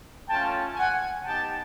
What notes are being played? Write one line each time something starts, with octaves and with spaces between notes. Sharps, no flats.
A3 C#4 F4 G5 A5
F#5 G#5
B3 D#4 G4 G5 A5